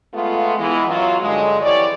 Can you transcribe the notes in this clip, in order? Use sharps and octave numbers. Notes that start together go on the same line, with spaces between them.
G#3 A3 B3 F4
E3 G#3 B3
F#2 F#3 F4
G2 D3 F#3 G#3
F2 E3 G3 C#5 D5